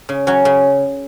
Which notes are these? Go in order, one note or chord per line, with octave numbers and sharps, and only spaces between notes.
C#3
F#3 C#4 F#4
C#3